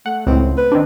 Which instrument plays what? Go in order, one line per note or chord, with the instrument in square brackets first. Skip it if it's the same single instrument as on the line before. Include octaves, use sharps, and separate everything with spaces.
[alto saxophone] A3 [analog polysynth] F#5
[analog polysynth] C#2 A2 [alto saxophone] C4
[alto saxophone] B4
[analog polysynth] D#3 C4 D4